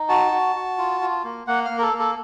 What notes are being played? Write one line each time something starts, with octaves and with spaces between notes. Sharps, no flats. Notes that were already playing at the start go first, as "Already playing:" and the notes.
Already playing: D#4
F#4 A5
F#4
F#4
F4
F4
A#3
A#3 F#5
F5
A#3
A#4
A4
A#3
A4